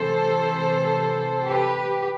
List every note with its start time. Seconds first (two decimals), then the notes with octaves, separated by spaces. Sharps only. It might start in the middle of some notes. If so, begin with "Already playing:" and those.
Already playing: C3 E3 A4 C5
1.44 G4 B4